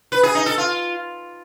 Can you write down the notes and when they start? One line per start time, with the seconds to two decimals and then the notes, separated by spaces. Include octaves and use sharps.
0.12 B4
0.23 G#4
0.35 D#4
0.46 A4
0.58 F4